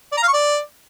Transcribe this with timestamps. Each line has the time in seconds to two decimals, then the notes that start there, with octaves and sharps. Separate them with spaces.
0.12 D5
0.17 A#5
0.22 F5
0.28 C#6
0.33 D5